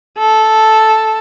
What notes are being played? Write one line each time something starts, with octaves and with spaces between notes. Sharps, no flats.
A4